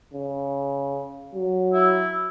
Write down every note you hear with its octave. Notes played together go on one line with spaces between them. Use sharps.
C#3
F#3
E4